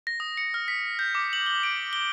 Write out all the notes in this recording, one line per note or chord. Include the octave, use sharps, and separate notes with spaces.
A#6
D#6
C#7
F6
B6
G6
D6
F#7
G7
D7
G7